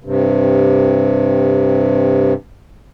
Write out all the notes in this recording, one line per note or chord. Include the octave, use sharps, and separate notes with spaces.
G2 C3